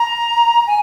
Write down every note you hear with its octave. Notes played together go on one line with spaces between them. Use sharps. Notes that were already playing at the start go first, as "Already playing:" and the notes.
Already playing: A#5
G#5